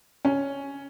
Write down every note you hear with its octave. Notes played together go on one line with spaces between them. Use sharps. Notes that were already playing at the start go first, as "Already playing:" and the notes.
C#4